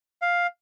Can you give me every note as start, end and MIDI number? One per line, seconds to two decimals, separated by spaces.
0.22 0.47 77